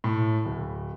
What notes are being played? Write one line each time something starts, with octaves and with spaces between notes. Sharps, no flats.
A2
D1